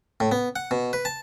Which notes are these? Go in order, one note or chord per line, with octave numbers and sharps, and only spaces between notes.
A2
B3
F#5
B2
B4
A5